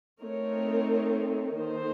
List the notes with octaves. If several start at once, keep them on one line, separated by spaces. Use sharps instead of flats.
A3 C4 D#4 A#4 C#5
D#3 A#3 D#4 A4 C5